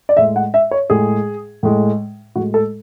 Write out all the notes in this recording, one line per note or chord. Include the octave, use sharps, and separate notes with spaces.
D5
A2 G#3 E5
F#5
E5
C#5
A2 G#3 G#4
A2 G#3
A2 G#3 F#4
A4